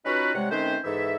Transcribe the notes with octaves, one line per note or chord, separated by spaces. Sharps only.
C#4 D#4 F4 F#4 A#4 B4
C3 G3 G#3 C#5 F#5
D#3 A3 C4 C#4 B4 C5
G#2 E3 A4 E5